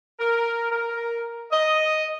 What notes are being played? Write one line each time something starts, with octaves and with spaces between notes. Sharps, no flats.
A#4
A#4
D#5